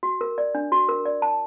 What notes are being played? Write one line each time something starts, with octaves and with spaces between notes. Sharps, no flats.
F#4
A#4
D5
D4
F#4
A#4
D5
A5